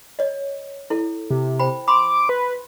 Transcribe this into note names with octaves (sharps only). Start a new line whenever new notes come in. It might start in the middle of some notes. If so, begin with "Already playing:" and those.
C#5 D#5
E4 A4
C3
C5 G5 B5
B5 C6 D6
B4